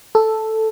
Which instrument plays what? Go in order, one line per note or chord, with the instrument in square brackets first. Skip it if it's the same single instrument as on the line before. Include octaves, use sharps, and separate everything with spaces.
[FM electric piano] A4